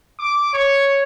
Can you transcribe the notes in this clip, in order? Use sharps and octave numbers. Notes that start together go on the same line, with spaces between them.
D6
C#5 C#6